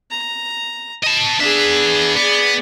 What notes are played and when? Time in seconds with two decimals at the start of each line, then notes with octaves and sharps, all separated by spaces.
0.11 A#5
1.03 D#5 A5
1.39 B3 D4 G#4 E5
2.17 B3 G#4 D5